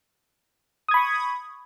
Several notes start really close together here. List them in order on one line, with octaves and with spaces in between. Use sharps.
D#6 G#6 B5 C#6